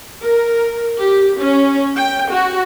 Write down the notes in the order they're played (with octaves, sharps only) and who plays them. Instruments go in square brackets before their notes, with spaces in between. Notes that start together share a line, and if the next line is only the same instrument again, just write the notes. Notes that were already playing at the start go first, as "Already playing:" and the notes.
[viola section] A#4
G4
C#4
G5
F#4